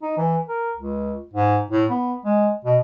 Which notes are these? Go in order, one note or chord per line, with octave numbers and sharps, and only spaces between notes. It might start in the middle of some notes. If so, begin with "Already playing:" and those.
D#4
E3
A#4
C#2
G#2
A2
B3
G#3
B2